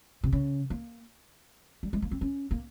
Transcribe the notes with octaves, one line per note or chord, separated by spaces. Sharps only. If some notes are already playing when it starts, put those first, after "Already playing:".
C3
C#3
A#3
G3
G#3
A#3
C4
C#4
A#3